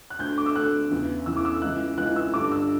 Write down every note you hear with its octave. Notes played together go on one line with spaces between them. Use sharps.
F#6
D2 D3 G6
D6
E6
D2 D3 F#6
E2 C#3 E3
E2 C#3 E3 E6
D6
E6
C#2 C#3 E3 F#6
C#2 C#3 E3 F#6
E6
G2 D3 D6
E6